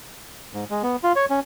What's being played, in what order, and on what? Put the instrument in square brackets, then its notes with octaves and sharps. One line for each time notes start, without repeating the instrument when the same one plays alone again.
[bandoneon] G#2
G#3
B3
F4
C#5
C#4